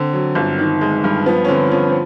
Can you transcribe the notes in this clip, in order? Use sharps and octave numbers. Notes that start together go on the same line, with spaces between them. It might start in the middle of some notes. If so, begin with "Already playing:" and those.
Already playing: D3 C4
F#3
G1
D#3
G#3
G2
F3 B3
C#4
D3 C4
F3 C#4
C4